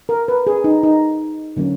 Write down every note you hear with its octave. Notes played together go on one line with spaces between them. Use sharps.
A#4
B4
G#4
D#4
D#4
D3 F#3 A#3 C#4